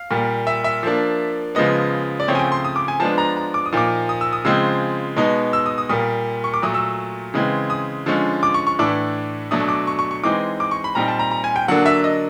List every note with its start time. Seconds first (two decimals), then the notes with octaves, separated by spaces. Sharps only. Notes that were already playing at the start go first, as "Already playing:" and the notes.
Already playing: F5
0.11 A#2 G3 A#3
0.47 E5
0.64 E5
0.83 F3 A#3 D4
1.55 C#3 F3 G#3 B3 D#5
2.20 D5
2.28 C#3 F3 A3 C4 C#5
2.35 G#5
2.39 G5
2.52 C6
2.64 D#6
2.76 D6
2.88 G#5
3.00 F3 G#3 B3 D4 A5
3.18 A#5
3.37 A#5
3.54 D6
3.66 D#6
3.72 A#2 F3 A#3 D#4 D6
4.09 D#6
4.21 E6
4.33 D#6
4.45 C#3 F3 G#3 C4 E6
5.17 B2 G#3 B3 D#4
5.53 E6
5.66 D#6
5.78 D#6
5.89 A#2 G3 A#3 D#6
6.44 C#6
6.54 D6
6.62 A#2 F#3 A3 D#6
6.74 E6
7.34 C#3 E3 G#3 C4
7.70 D#6
8.06 D3 F3 G#3 C#4
8.43 D6
8.54 C#6
8.67 C#6
8.79 A2 E3 A3 D4 D6
9.51 B2 F#3 A3 D4 D#6
9.69 D6
9.87 C#6
9.99 C#6
10.11 C#6
10.24 E3 G#3 C4 D#4 D6
10.60 D6
10.71 C#6
10.84 B5
10.95 A#2 G3 C4 D#4 A#5
11.08 A5
11.19 A#5
11.31 A#5
11.44 G#5
11.56 G5
11.68 D3 F#3 A#3 D4 F#5
11.86 E5
12.04 D#5